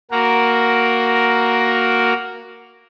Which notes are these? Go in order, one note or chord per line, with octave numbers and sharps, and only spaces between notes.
A#3 F#4 A#4